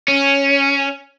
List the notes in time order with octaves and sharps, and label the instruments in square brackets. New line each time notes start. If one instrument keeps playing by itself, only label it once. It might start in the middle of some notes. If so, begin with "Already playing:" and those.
[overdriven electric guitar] C#4